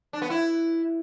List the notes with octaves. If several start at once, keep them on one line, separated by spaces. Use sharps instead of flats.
D4
B3
E4